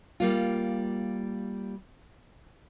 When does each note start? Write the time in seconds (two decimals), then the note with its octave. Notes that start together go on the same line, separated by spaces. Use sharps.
0.20 G3 A#3 F4